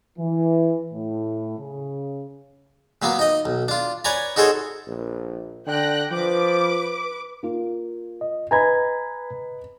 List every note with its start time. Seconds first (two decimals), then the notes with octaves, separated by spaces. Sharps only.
0.19 E3
0.93 A2
1.59 C#3
3.02 A#2 F#3 A#3 B3
3.19 D#4 D#5
3.45 B1
3.68 D4 F4
4.05 B4 C#5 D5 G#5 A#5
4.36 D#4 F#4 G#4 A4 C5 C#5
4.87 A#1
5.67 D3 G5 F#6 A#6
6.11 F3 B4 D6
7.43 A#3 F4
8.21 D#5
8.51 B4 D#5 G#5 A#5 B5 G#6